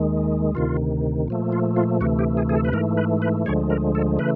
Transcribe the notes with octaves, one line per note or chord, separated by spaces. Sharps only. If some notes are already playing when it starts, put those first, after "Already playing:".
Already playing: D#2 D#3 G#3
D2 C3 D#3 F4
A#2 F3 A3
F4
F4
D2 C3 E3 A3 F#4
G4
G#4
G#4
A4
B4
G#2 E3 A3 A#4
B4
B4
D2 D3 F3 G#3 C#5
A#4
A4
C#3 E3 A3 B4